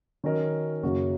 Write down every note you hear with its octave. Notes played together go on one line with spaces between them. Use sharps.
D#3 F#3 C#4 A#4 D#5
F#2 C#3 A#3 F#4 C#5